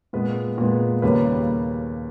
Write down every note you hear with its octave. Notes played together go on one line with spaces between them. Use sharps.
A#2 G#3 B3 B4
A#2 G#3 B3
D#2 C#3 G3 A#3 C#4 B4